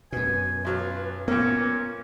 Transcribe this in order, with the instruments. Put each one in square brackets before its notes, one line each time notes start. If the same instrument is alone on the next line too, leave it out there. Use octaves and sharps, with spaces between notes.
[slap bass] F#2 B2 [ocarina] B4 [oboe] G#5
[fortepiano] B1 F#3 [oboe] F4
[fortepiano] A#2 A#3 [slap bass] B3 [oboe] C#4